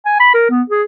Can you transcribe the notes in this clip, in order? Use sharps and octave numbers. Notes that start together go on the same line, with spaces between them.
G#5
B5
A#4
B3
G#4